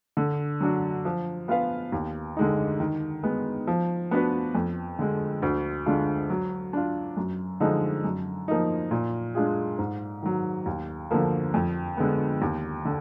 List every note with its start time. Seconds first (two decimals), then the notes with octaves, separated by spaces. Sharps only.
0.17 D3
0.60 F#3 D4 F#4
1.05 F3
1.48 B3 F4 B4 F5
1.92 D#2
2.37 D3 G#3 D#4
2.80 D#3
3.23 G#3 B3
3.67 F3
4.11 B3 D4 F#4 B4
4.55 F2
4.99 D3 G#3
5.42 D2
5.86 D3 G#3 D4 F4
6.30 F#3
6.73 D4 F4
7.17 F#2
7.60 D3 F3 G#3 D#4
8.04 F#2
8.48 F3 A#3 D#4
8.91 A#2
9.35 G#3 D4 F4 G#4
9.78 G#2
10.23 D#3 F#3
10.66 D#2
11.11 D3 F3 A#3
11.54 F2
11.97 D3 G#3 B3
12.42 D#2
12.85 D3